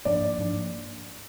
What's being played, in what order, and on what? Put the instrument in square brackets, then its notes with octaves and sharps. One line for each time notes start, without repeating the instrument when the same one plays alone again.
[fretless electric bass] G#2 F3 A#3 D4 [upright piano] D5
[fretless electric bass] G#2 F3 A#3 D4